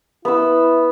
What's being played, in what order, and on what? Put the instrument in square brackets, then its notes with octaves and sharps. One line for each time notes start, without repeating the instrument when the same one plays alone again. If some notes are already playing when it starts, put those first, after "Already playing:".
[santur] B3 C6 E6 [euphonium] E4